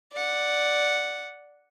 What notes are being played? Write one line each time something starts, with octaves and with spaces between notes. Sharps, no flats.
D5 F#5